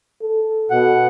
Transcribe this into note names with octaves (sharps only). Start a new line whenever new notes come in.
A4
B2 F#5